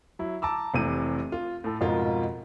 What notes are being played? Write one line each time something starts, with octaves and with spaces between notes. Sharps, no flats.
F#3 E4
A5 A#5 D6 E6
F1 C3 E3 D#7
F4
A2 A4
F2 G#2 B2 F4 A#4